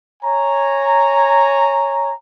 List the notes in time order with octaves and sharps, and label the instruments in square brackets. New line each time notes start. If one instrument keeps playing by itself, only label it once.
[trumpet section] C#5 G#5 A#5